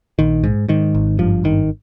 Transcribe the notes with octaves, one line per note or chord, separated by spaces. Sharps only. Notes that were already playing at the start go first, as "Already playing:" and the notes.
A#1 D#3
G#2
G#2 D#3
G#1
G2 F3
G#1 D#3